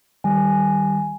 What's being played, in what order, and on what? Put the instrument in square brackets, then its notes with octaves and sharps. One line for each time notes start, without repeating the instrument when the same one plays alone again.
[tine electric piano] D#3 G3 [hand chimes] G#5